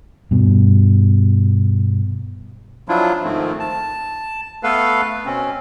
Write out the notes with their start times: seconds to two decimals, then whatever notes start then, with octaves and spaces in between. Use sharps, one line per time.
0.31 G2 B2
2.89 F3 F#3 D4 E4 F4
3.24 G#2 D#3 F3 A3 C4
3.59 A5
4.63 A3 B3 A4 B4 F5
5.26 B2 C4 C#4